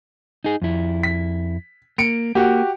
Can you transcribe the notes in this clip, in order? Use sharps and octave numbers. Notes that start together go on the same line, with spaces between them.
D#4 G#4
F2 E4
B6
A#3 C#7 D7
A#3 F#4 G4